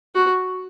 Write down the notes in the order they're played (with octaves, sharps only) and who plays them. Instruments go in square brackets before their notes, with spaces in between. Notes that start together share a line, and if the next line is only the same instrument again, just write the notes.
[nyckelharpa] F#4